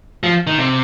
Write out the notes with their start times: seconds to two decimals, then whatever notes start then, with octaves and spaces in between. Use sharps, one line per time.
0.23 F3
0.47 D#3
0.58 C3